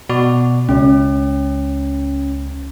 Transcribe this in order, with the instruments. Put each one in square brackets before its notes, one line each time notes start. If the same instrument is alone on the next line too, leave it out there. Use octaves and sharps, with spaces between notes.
[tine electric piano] B2 F#4 D5
[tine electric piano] C#2 [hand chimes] C#4